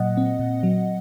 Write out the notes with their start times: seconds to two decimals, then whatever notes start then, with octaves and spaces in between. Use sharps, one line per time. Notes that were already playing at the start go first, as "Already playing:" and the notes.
Already playing: A#2 F#3 D#5 F#5
0.17 C4
0.39 A#2
0.63 F#3